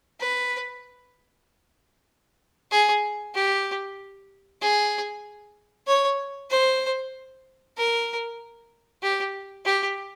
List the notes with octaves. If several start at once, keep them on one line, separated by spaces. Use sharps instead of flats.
B4
G#4
G4
G#4
C#5
C5
A#4
G4
G4